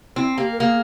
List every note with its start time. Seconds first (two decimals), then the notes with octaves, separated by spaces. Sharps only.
0.16 C4 E4
0.38 A#3 G4
0.52 A#4
0.60 A#3 G#4